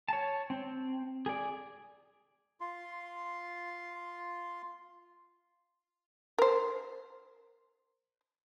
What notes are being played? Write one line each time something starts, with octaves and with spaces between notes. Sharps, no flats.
C#5 A5
C4
G#4 D5
F4 C6
A#4 C5